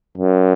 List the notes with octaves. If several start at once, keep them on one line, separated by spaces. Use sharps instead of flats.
F#2